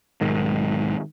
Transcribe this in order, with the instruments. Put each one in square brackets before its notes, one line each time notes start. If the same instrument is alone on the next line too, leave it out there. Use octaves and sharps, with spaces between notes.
[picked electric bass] B1 G#2 D#3